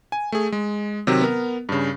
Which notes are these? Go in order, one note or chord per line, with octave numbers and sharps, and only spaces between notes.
G#5
A3 G#4
G#3
C3 D#3 F#3 C4
B3 A#4
G2 C#3